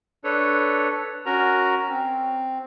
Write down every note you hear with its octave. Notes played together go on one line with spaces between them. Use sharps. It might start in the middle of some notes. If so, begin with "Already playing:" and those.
D4 A4 B4 C#5
C#4 F#4 A#4 A#5
C4